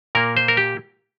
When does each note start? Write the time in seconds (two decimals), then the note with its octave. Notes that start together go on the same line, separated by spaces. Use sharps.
0.15 A#2 A#3 A#4
0.37 C5
0.48 A#4
0.57 G4